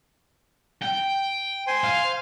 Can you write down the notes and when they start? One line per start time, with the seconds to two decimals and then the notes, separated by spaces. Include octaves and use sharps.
0.83 G5
1.67 C5 G#5 C6
1.84 F5